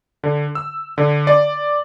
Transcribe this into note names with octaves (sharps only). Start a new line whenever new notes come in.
D3
E6
D3
D5